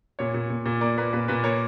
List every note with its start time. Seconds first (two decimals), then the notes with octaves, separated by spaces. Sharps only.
0.19 A#2 C#5
0.34 A#2
0.50 A#2
0.66 A#2
0.81 A#3 D5
0.98 A#3 B4
1.13 A#2 B4
1.28 A#2 B4
1.44 A#3 C#5